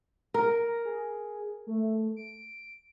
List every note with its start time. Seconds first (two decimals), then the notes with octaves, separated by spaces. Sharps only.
0.34 A#4
0.64 A#5
0.85 G#4
1.67 A3
2.16 D7